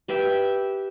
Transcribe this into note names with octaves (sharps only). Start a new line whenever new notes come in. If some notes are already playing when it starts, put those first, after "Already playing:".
G4 B4 E5 G5